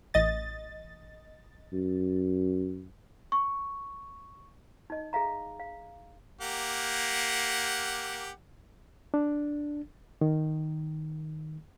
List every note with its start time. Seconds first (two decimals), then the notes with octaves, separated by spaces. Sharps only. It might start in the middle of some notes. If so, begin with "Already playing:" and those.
0.14 A1 D#5 A6
1.73 F#2
3.32 C#6
4.90 D#4 D#5
5.13 G#4 E5 F5 A#5
5.59 F5
6.41 A#3 G4 F#5
9.14 D4
10.21 D#3